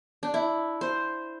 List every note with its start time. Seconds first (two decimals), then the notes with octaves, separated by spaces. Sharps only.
0.23 D4
0.34 E4
0.81 C5